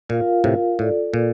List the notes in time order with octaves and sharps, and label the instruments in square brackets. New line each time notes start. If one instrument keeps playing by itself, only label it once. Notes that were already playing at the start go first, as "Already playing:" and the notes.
[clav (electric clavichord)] A#2 [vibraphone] F4 A#4 F5
[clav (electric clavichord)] A2 C3 [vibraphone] F4 A#4 F5
[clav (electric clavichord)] A2 [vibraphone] F4 A4 D5
[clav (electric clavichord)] A#2 [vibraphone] F4 A4 D5